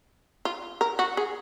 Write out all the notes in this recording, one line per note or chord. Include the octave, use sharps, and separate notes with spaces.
F4
A#4
F#4
G#4